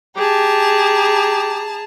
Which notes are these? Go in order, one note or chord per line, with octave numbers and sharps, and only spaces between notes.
G4 G#4 A5 A#5